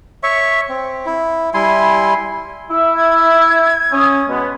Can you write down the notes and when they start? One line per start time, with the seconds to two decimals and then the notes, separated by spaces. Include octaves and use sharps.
0.23 C#5 E5 C#6
0.69 C4
1.06 E4
1.54 G3 E4 G#5 C6
2.71 E4 E5
2.95 G#6
3.93 C#4 D#6
4.29 B2 G#3 B3